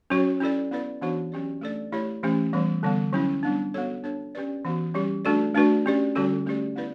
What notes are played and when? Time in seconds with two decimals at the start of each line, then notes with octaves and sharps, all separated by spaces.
0.10 F#3 C#4 F#4 C#5
0.40 C#4 E4 A4 D5
0.71 B3 E4 B4 D5
1.01 E3 B3 D4 F#4 C#5
1.32 F#3 C#4 G4 D5
1.61 A3 D4 A4 D5
1.92 A3 E4 G4 C#5
2.23 E3 A3 C#4 G4
2.53 E3 G3 B3
2.83 D3 G3 B3
3.13 F#3 C#4 E4
3.43 G3 B3 D4
3.74 B3 F#4 A4 C#5
4.04 B3 D4 A4 C#5
4.35 C#4 G4 B4 D5
4.65 E3 B3 F#4
4.94 G3 C#4 G4
5.25 A3 D4 F#4 A4 D5
5.55 A3 D4 F#4 B4 D5
5.86 C#4 G4 D5
6.15 D3 G3 C#4 F#4 A4
6.46 A3 C#4 G4 D5
6.76 B3 E4 B4 D5